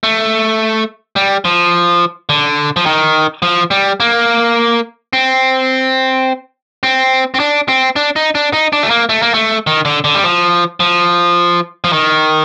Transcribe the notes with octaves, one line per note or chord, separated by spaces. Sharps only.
A3
G3
F3
D3
F3
D#3
F3
G3
A#3
C4
C4
C4
D4
C4
D4
D#4
D4
D#4
D4
A3
A#3
A3
A#3
A3
D#3
D3
D3
G3
F3
F3
F3
D#3